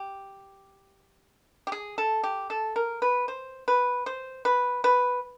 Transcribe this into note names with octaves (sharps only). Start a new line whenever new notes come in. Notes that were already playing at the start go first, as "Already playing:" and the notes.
Already playing: G4
G4
G#4
A4
G4
A4
A#4
B4
C5
B4
C5
B4
B4